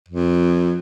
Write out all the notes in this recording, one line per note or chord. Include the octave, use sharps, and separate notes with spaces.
F2